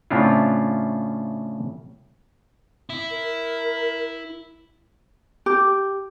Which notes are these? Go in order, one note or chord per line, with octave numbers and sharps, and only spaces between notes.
A2 C#3 C4 D4 E4 F4
E4
A#4
G4